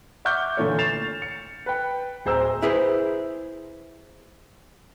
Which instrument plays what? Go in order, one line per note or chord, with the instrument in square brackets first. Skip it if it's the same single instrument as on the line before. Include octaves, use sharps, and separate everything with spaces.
[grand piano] E5 F#5 C#6 D6 F6 G6
A#2 D3 E3 A3 C#5
A6 C7 E7 F7
C#7
B4 G5
D1 G#4 C5 A#5 E6
[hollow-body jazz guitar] E4 G#4 B4 C5